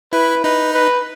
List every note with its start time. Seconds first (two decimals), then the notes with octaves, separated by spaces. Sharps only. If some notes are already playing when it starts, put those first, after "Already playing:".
0.13 E4 B4
0.44 D#4 B4
0.74 B4